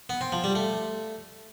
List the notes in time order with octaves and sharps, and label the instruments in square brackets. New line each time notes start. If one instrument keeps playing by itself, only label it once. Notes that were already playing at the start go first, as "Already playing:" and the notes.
[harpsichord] B3
C4
F3
G3
A3